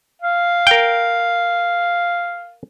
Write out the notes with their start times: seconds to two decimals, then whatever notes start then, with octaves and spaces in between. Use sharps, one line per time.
0.22 F5
0.67 A#4 G5